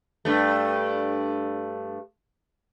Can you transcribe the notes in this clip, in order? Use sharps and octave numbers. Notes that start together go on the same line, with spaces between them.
G2 A3